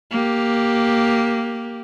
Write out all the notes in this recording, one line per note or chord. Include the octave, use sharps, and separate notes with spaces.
A#3 G4